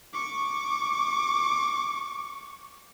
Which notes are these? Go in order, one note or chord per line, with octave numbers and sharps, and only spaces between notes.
C#6 D6